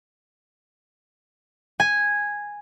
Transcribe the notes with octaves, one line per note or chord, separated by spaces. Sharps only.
G#5